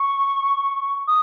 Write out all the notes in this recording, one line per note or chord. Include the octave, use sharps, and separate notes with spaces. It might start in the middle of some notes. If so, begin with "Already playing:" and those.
Already playing: C#6
D#6